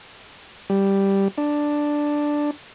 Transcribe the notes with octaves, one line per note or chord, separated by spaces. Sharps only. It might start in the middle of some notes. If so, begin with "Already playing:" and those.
G3
D4